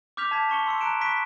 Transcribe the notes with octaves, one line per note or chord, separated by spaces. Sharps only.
D6 F6 G6 B6 F7
A5 G#6 B6
A5 C#6 C#7 G7
C6 E6 C#7
A#5 F#6 C#7 D7 E7
B5 C#6 F#6 B6 D7